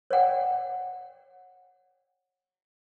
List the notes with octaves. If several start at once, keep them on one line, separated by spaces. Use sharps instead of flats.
C#5 D5 F#5 G5